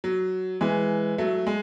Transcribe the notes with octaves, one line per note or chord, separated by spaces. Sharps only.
F#3
E3 G#3
F#3 A3
G#3